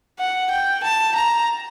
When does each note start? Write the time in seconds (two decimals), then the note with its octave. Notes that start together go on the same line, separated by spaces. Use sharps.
0.19 F#5
0.51 G5
0.84 A5
1.16 A#5